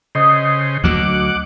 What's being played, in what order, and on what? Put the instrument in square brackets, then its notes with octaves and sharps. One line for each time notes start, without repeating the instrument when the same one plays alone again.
[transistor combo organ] C#3 C5 [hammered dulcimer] D#5
[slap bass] D2 F#3 [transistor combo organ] F#5 D6